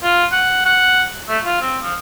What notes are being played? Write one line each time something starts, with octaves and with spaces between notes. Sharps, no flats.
F4
F#5
F#5
A3
F4
C4
F3